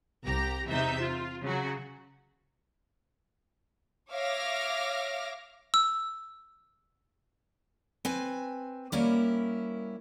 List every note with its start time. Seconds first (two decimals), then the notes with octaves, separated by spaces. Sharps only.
0.23 C2 G4 A#5
0.68 E2 C3 D#4 E5 G6
1.01 F4
1.43 C#3 F#3 F#4
4.10 C#5 E5 F5 D6 F6 A#6
5.74 E6
8.05 C4 B4 G#5
8.92 G3 A#3 C#4 E4 A#4 C#5